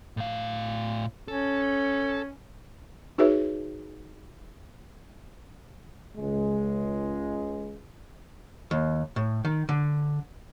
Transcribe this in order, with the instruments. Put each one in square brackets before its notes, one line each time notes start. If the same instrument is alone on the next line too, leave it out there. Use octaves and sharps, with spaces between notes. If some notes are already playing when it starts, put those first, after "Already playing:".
[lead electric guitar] A2 F5
[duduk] C#4 [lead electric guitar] A4
[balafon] D#4 F#4 G#4 B4 C#5 E5
[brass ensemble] C#2 G#3
[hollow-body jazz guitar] D#2
A2
D#3
D3